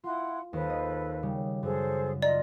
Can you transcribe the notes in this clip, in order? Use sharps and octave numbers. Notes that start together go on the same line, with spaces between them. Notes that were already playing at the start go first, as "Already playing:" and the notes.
E4 F4 F#5 C6
D#2 A4 B4 C5
D#5
C#3 G3
F#2 G#4 A4 C5
F4 D5 D#5 A#5